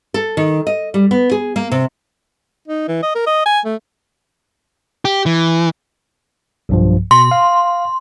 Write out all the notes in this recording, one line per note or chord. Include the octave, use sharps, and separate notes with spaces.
A4
D#3
D#5
G3
B3
G#4
A#3
C3
D#4
E3
D#5
A#4
D#5
G#5
A3
G4
E3
B1 G2 F3
B2 C6
F5